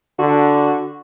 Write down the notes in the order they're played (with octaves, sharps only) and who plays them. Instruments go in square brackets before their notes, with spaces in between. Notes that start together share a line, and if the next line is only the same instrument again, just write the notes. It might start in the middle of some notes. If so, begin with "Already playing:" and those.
[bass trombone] D3 [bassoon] F#4